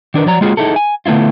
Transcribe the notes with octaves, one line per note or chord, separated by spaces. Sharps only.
D#3 D4 A#4 B4
F3 F#3 D5 A#5
G#3 A#3 F4 F#4 G#4
D#4 E4 G#4 A4
G#5
D3 A3 B3 E4 F4